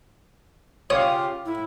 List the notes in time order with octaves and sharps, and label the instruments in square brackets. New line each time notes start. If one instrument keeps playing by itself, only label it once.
[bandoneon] C#3 F4 G4 [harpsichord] C#5 [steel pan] F5 D#6
[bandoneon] A2 [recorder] E4